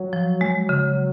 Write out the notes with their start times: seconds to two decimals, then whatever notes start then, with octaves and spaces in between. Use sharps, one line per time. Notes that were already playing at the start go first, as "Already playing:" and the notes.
Already playing: F#3
0.13 F3
0.41 G#3
0.69 C#3